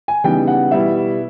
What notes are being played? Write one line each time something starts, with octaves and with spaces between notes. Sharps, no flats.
G#5
C#3 E3 G3 B3 D#4 G5
F#5
B2 G3 B3 E4 E5